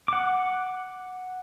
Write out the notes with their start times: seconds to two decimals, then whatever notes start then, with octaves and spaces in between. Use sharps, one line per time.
0.08 F#5 D6